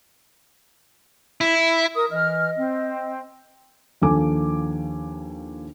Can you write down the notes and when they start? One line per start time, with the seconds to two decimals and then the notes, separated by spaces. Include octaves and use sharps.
1.41 E4
1.95 A#4 D#6
2.11 E3 D#5 F6
2.57 C4
4.02 D#2 F3 D4 A4 G#5 D6